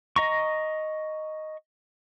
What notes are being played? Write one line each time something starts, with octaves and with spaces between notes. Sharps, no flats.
D#5 A#5 C#6